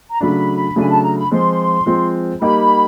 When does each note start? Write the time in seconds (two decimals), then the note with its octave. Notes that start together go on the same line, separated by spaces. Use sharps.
0.10 A#5
0.21 C#3 F#3 A3 D4 B5
0.76 C#3 F#3 A3 D4 G#5
0.89 A5
1.03 A#5
1.17 B5
1.31 F3 G#3 C4 F4 C6
1.86 F3 G#3 C4 F4
2.41 G3 A#3 D#4 G4 B5